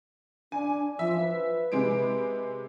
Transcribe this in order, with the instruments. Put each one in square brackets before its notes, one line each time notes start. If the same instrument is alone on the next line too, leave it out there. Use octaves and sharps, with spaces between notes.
[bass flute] D4 [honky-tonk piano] G#5
[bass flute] F3 [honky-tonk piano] E5
[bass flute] B4
[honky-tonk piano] C3 G#3 D7